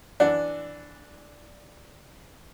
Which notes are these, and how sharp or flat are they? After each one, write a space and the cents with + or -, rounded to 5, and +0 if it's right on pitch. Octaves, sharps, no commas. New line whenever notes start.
E3 +5 D4 +0 F#5 +0